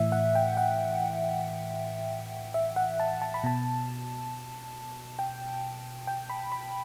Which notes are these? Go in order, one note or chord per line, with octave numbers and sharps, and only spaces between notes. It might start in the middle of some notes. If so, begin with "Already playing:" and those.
Already playing: A2 E3 E5
F#5
G5
F#5
E5
F#5
A5
A5
B5
B2 A5
G5
G5
B5
B5